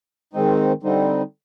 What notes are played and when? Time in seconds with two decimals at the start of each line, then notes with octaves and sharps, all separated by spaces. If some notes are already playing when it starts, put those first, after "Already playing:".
0.33 G#2 D#3 G#3 C4 D#4
0.83 D3 G3 C4 D#4